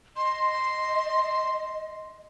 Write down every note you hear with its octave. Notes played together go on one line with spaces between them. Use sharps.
D#5 C6